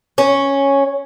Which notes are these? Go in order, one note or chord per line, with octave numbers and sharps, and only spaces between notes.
C#4